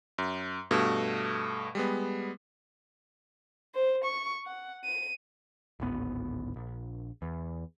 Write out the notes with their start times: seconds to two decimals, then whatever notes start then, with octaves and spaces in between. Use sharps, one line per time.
0.18 F#2
0.71 G2 B2 A3
1.75 G3 G#3 B3
3.75 C5
4.04 C#6
4.46 F#5
4.85 D#7
5.80 D1 G#1 B3
6.56 A#1
7.22 E2